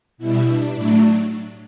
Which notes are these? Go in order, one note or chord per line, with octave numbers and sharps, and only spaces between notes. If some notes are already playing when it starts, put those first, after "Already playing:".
B2 G3 E4
D4
A2 F#3 A3